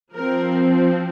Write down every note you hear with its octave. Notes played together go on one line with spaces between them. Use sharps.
F3 C4 A#4